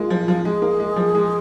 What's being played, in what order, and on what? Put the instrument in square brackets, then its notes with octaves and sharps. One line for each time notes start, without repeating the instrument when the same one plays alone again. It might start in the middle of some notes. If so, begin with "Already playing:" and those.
Already playing: [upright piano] G#3 A#3 [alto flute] F4
[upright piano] F3
F3
[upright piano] G#3 [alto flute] G#4
[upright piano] A#3
G#3
F3
G#3